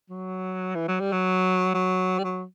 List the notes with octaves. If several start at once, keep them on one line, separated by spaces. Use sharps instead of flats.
F#3
E3
F#3
G3
F#3
F#3
G3
F#3